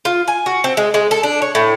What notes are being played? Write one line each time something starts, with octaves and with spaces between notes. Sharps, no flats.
F4
G#5
F#4
C4
G#3
G#3
A4
D4
C#5
A2